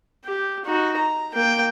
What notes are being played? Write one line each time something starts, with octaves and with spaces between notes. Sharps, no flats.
G4
D#4 F#4
A#5
A#3 G5